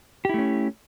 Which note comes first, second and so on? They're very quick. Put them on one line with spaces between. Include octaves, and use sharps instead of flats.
G4 E4 A3 C#4